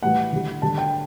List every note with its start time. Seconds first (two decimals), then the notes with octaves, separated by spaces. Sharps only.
0.02 A2 E3 G3 F#5
0.32 D3 G3
0.62 D3 G3 A5
0.78 G5